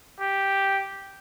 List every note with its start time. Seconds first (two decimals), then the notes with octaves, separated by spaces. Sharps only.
0.21 G4